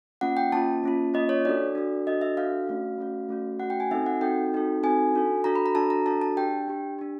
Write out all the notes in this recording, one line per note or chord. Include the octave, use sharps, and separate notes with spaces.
A#3 C#4 F4 F#5
G5
A#3 C#4 F4 A5
A#3 C#4 F4
A#3 C#4 F4 D#5
C#5
D4 F#4 A4 D5
D4 F#4 A4
D4 F#4 A4 D#5
E5
D4 F#4 A4 F5
A3 C#4 F#4
A3 C#4 F#4
A3 C#4 F#4
A3 C#4 F#4 F#5
G5
G#5
C4 D#4 F#4 A4 E5
F#5
C4 D#4 F#4 A4 G5
C4 D#4 F#4 A4
C4 D#4 F#4 A4 G#5
D4 F#4 A4
D4 F#4 A4 A#5
B5
A#5
D4 F#4 A4 A5
A#5
D4 F#4 A4 A5
A5
D4 G4 G5
D4 G4
D4 G4